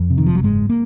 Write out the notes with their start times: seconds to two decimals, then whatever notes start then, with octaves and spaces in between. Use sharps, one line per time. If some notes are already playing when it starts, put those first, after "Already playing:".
Already playing: F2
0.10 C3
0.18 D#3
0.26 F#1 F3
0.35 F#3
0.43 G#2 G#3
0.70 A#3